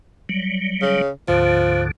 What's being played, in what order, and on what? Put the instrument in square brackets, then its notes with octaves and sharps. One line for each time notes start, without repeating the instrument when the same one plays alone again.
[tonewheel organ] F#3 G3
[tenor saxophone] C#3
[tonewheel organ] D2 G#2 D3 [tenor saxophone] F3